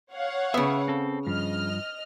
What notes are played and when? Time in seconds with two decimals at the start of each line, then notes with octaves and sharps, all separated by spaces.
0.12 C#5 F5 F#5
0.54 C#3 B3 E5
0.88 C4 A4
1.27 G2 F3 D#5 F6